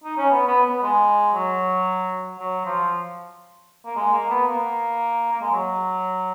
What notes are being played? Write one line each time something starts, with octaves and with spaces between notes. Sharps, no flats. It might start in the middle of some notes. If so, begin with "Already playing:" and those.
D#4
C#4
B3
B3
B3
G#3
F#3
F#3
F3
A#3
G#3
A#3
B3
A#3
A#3
G#3
F#3